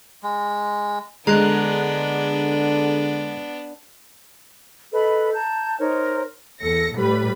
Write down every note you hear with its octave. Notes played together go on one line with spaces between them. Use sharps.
G#3
D3 G#3 B3 D4 A#5 F#6
A4 B4 D#5 B5
A5 A#5 G6
D#4 A#4 C5 C#5
E2 A4 A#6 C#7
A2 G3 B4 B5